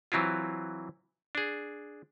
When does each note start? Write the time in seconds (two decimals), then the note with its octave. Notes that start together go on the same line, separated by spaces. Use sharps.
0.12 E3 F#3 C4 E4 F4
1.35 D4 G#4